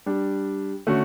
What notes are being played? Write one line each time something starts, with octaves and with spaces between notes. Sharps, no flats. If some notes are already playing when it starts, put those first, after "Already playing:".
G3 D4 G4
D3 A3 C#4 F#4